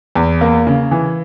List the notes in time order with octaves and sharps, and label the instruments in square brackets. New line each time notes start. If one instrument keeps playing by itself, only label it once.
[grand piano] E2
A#3
C#3
E3